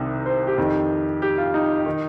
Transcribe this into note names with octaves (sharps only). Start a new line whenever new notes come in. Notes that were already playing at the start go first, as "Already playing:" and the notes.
Already playing: C2 C3 D#3
C5
G4
F2 D#3
G4
F4
D#4
D#3